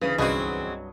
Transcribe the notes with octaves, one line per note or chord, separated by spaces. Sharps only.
D2 C#3 E3 B4 D#6
C2 G2 C3 F#3 C4 F#4 G#4 D#5